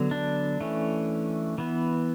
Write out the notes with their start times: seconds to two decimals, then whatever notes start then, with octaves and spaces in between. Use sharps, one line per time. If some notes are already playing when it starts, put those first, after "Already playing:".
Already playing: D3 F#3 B3
0.11 D4
0.61 E3 A3 C#4
1.58 E3 B3